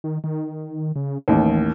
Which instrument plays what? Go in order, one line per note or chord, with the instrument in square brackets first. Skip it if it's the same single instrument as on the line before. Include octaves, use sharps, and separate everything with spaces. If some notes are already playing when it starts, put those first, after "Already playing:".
[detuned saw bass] D#3
D#3
C#3
[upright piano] A1 D#2 [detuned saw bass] E3